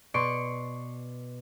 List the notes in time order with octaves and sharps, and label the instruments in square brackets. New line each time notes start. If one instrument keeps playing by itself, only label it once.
[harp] B2 D5 C6 C#6 D7